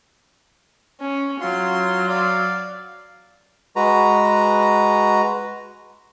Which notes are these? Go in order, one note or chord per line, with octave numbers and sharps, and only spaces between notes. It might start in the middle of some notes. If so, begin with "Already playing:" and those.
C#4
F#3 F4 C6
D5 F5
G#3 F#4 B4 A#5